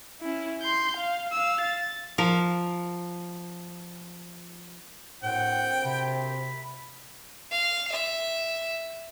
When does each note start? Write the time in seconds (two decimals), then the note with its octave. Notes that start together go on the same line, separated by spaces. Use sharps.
0.22 C#4 E4
0.62 C6 G6
0.97 F5
1.32 F5 E6
1.61 A6
2.18 F3 A#4 F5
5.23 D2 A2 A#3 C4 F#5 G5
5.85 C3 B5
7.52 F5
7.91 E5